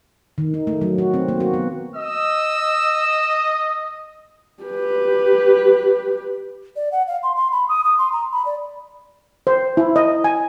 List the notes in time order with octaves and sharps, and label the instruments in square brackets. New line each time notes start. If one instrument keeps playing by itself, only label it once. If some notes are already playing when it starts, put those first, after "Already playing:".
[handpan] D#3
D#4
A3
F#3
F#4
C4
A#3
F#4
B3
[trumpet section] D#5 [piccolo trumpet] E6
[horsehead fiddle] G4 B4
[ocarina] D5
F#5
F5
C6
C6
B5
D#6
D#6
C6
A#5
B5
D5
[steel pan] C5
E4
D#5
G#5